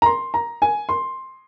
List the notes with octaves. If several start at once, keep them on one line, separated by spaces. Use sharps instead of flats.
A#5
C6
A#5
G#5
C6